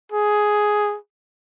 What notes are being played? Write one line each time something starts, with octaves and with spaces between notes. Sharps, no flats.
G#4